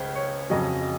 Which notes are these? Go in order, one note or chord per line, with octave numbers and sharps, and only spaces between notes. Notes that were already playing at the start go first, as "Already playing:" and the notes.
Already playing: C#2 C#3 C5
C#5
F2 C#3 F#3 D#5